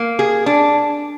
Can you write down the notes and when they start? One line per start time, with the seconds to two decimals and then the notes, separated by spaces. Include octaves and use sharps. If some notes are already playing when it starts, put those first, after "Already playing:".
Already playing: A#3
0.19 G#4
0.46 D4